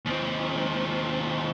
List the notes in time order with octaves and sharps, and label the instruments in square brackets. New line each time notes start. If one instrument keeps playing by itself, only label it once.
[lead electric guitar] D#2 C4